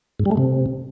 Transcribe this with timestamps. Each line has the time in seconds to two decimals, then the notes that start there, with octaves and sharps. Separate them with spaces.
0.20 G#2
0.25 G3
0.31 A3
0.37 C3